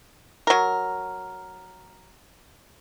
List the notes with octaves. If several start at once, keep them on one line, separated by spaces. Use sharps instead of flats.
F#3 A#4